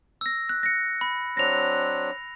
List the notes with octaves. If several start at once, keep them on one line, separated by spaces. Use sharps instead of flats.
E6 A#6
F#6
A#6 C#7
B5
F#3 C4 D4 A#6 F7